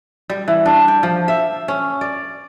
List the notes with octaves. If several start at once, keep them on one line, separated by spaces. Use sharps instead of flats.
G3
E3
D4
G5
F3
E5
C#4
D5